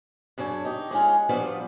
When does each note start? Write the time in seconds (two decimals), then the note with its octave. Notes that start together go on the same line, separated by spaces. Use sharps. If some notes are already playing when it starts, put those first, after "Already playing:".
0.38 F#2 C#3 D4 C#5
0.65 D#4 G4
0.91 G#3 C#4 D#4 F4
1.29 F3 G3 B3 D4 F4 F#4